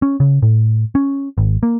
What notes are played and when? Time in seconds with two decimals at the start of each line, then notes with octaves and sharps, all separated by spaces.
0.02 C#4
0.20 C#3
0.42 A2
0.95 C#4
1.38 G#1
1.63 A#3